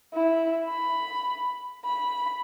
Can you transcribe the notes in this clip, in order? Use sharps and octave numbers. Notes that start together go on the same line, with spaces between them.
E4
B5
B5